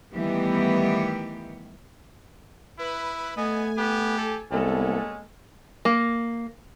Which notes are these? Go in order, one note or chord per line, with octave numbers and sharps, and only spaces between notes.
D#3 E3 G3 A3 B3 G4
E4 B4 B5
A3 B3 D#5 G#5
B3 G4
A4
C2 G#3 A#3 B3 C#4 A4
A#3